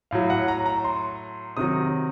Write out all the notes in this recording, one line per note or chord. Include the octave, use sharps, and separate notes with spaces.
A2 F#3 F5
F#5
A#5
A#5
C6
C3 D#3 F#3 D#6